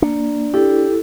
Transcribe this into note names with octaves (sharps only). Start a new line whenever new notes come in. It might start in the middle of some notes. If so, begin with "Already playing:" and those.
A#3 D4
E4 G4 A4